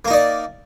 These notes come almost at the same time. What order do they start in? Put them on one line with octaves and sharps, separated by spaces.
A#3 A#4 D#4 D5